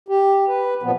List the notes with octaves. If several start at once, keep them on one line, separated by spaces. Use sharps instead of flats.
G4
B4
A#2 F3 B3